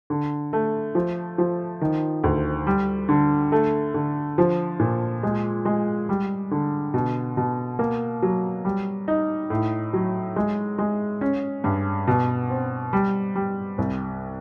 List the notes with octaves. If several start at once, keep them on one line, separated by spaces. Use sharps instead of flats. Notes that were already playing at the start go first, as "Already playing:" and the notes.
D3
A3
F3
F3
D#3
D2
G3
D3
A3
D3
F3
A#2
G#3
G#3
G3
D3
B2
B2
A#3
F#3
G3
D#4
A2
F#3
G#3
G#3
C#4
G2
B2
C4
G3
G3
C2